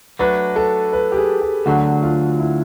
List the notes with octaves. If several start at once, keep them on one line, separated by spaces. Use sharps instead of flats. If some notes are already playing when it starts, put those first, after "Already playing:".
F#3 A3 D4 B4
A4
B4
G4
G#4
G4
D2 D3 F#3 F#4
F4
E4